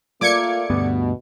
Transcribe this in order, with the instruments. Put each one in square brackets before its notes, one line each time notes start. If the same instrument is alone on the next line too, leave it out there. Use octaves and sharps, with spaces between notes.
[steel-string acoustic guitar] A3 D5 [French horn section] A#3 F4 [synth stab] D6 G#6 C#7
[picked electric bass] D2 G2 B3 [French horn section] B2